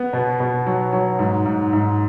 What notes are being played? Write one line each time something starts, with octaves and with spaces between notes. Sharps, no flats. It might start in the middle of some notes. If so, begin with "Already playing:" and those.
Already playing: B3
B2
B2
F#3
F#3
G#2
G#2
G#2